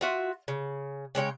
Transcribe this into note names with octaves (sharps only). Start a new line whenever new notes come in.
F4 F#4 E5
C#3
C#3 G#3 C#5 G5